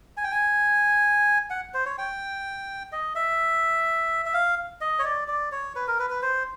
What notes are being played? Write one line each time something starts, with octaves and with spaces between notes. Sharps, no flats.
G#5
G5
G#5
F#5
C5
C#5
G5
D#5
E5
E5
F5
D#5
C#5
D5
D5
C#5
B4
A#4
B4
B4
C5